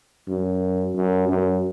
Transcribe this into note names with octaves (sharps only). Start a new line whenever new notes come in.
F#2
F#2
F#2